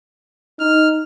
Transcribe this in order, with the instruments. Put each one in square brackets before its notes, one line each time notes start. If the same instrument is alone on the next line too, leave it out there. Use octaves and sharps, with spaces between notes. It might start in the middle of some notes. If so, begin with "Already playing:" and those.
[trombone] D#4 [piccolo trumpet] F6